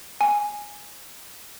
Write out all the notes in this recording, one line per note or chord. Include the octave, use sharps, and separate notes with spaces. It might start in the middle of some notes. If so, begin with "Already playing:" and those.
G#5